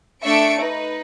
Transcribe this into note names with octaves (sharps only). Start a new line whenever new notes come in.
A3 D4 E5 C#6 C#7 D7
D#4 B4